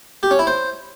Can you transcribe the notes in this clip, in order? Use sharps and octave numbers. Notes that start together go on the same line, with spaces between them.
G4
C#4
E4
C5